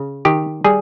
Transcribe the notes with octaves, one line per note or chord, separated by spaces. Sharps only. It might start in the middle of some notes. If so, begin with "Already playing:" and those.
Already playing: C#3
D#3 G4
G3 G#4